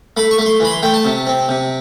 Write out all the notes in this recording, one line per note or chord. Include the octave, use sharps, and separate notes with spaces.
A3 B5
C#6
A3
C6
E3 B5
C6
A3 G5
A5
C3
C4
C3